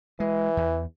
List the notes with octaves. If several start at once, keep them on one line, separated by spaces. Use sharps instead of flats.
E3 G#3
E2